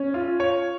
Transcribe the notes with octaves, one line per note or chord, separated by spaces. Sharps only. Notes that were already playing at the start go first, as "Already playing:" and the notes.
Already playing: C#4
F4
C#5